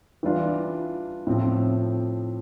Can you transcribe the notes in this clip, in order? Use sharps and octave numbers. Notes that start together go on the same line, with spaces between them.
E3 G3 D4 F4
A2 F3 C4